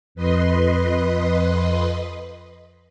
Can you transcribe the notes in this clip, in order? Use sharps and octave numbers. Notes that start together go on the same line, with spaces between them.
F2 B4 D#5 C6